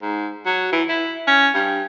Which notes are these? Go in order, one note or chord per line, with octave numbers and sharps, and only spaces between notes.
G#2
F#3
E3
E4
C#4
G2